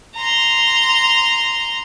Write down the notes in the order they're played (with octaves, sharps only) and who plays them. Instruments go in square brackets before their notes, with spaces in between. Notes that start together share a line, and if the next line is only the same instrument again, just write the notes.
[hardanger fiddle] A#5 C6